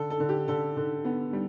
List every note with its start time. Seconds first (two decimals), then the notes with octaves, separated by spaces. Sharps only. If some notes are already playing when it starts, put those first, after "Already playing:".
Already playing: D3 A4
0.10 A4
0.20 D3
0.29 G4
0.48 D3 A4
0.77 D3
1.05 B3
1.33 G3